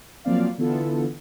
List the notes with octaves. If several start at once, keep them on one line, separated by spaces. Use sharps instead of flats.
F3 F#3 A#3 C4 D5 F5
D3 E3 B3 E4 F4 A4